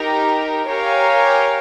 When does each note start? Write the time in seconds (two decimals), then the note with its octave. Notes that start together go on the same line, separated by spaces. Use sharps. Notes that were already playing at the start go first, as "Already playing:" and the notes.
Already playing: D#4 G4 A#4
0.68 G4 A#4 C#5 F5 G#5